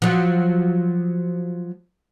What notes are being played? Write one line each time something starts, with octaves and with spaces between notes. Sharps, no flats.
F3 F#3